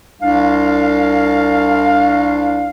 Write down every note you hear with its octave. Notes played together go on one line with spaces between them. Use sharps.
C2 D4 F5